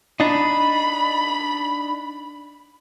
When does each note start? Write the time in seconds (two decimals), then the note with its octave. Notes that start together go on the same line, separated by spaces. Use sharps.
0.20 D4 D#4 B5